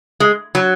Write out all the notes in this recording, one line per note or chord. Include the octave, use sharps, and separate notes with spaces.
G#3
F#3